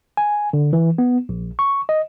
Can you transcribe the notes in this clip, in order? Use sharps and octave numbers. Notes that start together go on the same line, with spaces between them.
G#5
D3
E3
B3
A#1
C#6
D#5